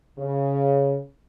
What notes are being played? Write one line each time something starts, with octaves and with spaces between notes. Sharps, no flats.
C#3